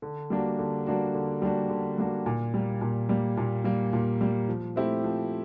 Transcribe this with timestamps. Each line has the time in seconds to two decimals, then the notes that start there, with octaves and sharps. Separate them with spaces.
0.02 D3
0.30 G3 A#3 D4 F#4
0.59 D3
0.86 G3 A#3 D4 F#4
1.15 D3
1.42 G3 A#3 D4 F#4
1.69 D3
1.98 G3 A#3 D4 F#4
2.26 A#2
2.54 G3 A#3
2.81 A#2
3.09 G3 A#3
3.37 A#2
3.64 G3 A#3
3.93 A#2
4.21 G3 A#3
4.49 F3
4.76 A3 C4 E4 G4
5.04 F3